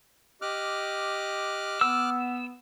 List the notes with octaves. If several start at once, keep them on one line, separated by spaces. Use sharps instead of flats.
G4 D#5 D6 F6 F#6
B3 E6